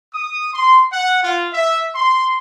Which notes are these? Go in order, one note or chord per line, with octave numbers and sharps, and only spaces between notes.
D#6
C6
F#5
F4
E5
C6